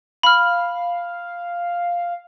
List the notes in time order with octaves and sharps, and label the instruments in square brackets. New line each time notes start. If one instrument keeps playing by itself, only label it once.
[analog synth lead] F5 [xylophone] B5 F6